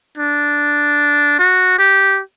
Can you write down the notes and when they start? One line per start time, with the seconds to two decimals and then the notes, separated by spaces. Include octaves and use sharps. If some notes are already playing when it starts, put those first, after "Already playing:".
0.18 D4
1.39 F#4
1.79 G4